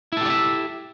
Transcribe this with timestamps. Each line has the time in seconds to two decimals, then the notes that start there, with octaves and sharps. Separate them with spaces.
0.12 E4
0.17 A4
0.21 G4
0.26 D5
0.30 E5